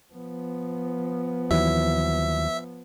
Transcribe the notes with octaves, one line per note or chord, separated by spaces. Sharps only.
F3 B3
D#2 E3 F#3 E5